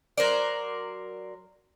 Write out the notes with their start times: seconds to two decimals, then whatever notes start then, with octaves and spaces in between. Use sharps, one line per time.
0.17 F#3 A#4 C5 D5